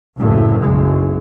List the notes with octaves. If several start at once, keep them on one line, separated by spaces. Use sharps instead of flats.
F#1 D2 A2
F#1 B1 G#3